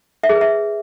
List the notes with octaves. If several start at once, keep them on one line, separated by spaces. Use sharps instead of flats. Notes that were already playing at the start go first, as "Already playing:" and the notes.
E5
G#4
B4
E5